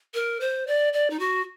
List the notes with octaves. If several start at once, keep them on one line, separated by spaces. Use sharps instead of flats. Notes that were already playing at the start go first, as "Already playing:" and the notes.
A#4
C5
D5
D5
D#4
F#4